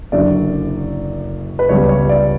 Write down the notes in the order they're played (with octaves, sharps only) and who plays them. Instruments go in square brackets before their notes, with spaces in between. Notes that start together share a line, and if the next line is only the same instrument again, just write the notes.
[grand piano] F#1 F#2 D3 D5
B4
C#2 C#3 G3 B3 C#5
C#5
D5